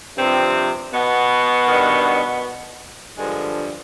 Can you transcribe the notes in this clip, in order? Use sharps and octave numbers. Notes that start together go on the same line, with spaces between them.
G2 C3 F3 C4
B2 B3
G2 D#3
G2 D3 F3 G#3